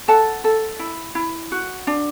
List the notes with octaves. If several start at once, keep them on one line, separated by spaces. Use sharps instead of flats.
A4 F#5 A5
A4
E4
E4
F#4
D4